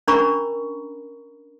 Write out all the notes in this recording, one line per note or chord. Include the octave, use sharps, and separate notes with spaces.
C#4 D4 A#4 A#5 B5 C#6